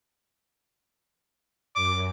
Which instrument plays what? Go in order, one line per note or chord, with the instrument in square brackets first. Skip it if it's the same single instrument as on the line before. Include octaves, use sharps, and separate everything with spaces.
[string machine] F#2 [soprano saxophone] D6